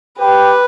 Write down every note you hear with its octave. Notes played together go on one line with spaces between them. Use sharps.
G4 B4